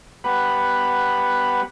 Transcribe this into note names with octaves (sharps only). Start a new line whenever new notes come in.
G3 B3 B4 F#5